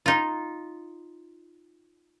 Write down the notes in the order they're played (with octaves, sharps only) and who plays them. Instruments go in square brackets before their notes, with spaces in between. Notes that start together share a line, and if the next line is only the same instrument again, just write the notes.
[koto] D#4 F4